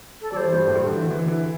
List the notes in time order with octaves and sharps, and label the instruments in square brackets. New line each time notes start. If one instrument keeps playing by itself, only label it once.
[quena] A4
[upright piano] G3 [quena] C5 D5
[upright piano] E3
G2 G3
A2 A3
G2 G3
D3
E3
D3
E3
D3
E3